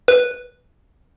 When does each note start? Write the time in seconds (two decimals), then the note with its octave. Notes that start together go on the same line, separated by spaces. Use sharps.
0.08 B4